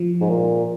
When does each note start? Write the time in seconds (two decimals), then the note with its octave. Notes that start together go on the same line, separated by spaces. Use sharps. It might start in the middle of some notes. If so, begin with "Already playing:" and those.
Already playing: F3
0.21 G#2
0.29 A#2